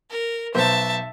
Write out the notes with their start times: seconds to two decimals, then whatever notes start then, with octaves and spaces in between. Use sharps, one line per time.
0.11 A#4
0.55 B1 B3 C5 E5 A5